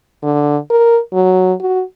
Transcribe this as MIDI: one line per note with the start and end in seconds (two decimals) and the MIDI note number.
0.23 0.57 50
0.70 0.99 70
1.13 1.53 54
1.61 1.82 66